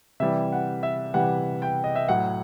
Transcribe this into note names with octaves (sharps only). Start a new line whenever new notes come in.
C3 E3 G3 E5
F#5
E5
C3 E3 G3 F#5
G5
D#5
E5
A2 F#3 F#5